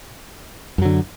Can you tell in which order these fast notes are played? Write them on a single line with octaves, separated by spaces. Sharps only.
F#2 F#3 D3